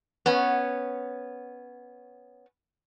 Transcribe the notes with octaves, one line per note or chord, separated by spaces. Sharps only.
B3 C#4